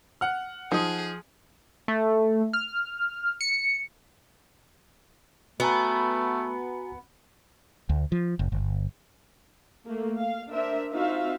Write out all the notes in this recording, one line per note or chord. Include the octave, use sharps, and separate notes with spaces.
F#5 F6
F3 D#4 G#4 D#5
A3
F6
C#7
A3 B3 F#4 G#5 A#5
D2
F3
F#1
G1
A3 A#3
F5
D4 A#4 C5 E5
C4 D#4 F4 F#4 E5 F5